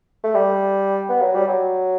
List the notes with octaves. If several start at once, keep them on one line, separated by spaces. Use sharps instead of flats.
A3
G3
B3
F#3
G3
F#3